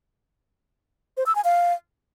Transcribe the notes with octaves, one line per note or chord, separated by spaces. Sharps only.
C5
E6
G#5
F5